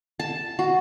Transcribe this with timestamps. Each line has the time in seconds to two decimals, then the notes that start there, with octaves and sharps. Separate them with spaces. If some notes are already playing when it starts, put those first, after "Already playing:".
0.20 A5
0.59 F#4